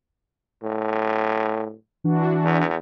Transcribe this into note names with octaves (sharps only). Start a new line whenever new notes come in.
A2
E3 D4 F#4
E2